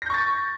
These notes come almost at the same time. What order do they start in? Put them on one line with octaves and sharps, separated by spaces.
A#6 G6 C#6 A6